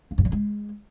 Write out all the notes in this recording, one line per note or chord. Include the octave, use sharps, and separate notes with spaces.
A#3
G2
G3
G#3